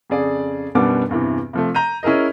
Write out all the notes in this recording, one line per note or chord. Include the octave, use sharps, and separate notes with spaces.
F2 C#3 G#4 D5
F#2 B2 G3 B3 D4 D6
E2 G2 C3 E3
C3 F3 A3
A#5 G6 D#7
C#4 E4 G#4 A#4 D#5